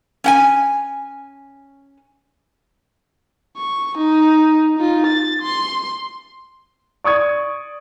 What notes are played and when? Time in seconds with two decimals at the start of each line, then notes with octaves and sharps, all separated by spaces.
0.24 C#4 F#5 G#5
3.57 C#6
3.97 D#4
4.77 D#4 F4
5.06 A6
5.42 C6
7.04 D5 C#6 D#6 G#6